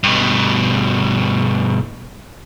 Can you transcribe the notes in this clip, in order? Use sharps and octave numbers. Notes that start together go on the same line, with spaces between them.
G2 B2